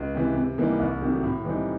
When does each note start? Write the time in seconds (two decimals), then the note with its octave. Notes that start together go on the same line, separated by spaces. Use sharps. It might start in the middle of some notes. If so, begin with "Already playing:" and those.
Already playing: C#2
0.14 C3 E3
0.36 C3
0.58 E3 G3 A#3 D#4
0.79 C2
1.01 C3 D#3 F#3 A3
1.23 A2
1.45 E3 G3 C4 D#4